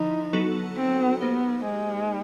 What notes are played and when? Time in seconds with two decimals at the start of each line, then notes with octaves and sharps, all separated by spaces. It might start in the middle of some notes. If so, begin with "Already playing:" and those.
Already playing: D3 F3 D#4 E4
0.33 F#3 B3 D#4 F#4 A4
0.77 C4
1.20 A#3 B3 D#4 G4 C5
1.65 G#3